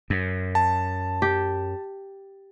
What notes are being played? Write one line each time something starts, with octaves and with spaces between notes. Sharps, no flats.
F#2
A5
G4